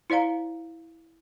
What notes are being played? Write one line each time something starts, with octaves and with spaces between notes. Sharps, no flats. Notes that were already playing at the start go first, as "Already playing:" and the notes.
E4 C5 D5 F5 A#5